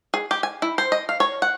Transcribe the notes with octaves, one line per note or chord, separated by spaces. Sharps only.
G#4
G4
G#5
E4
C5
D#5
F5
C#5
F#5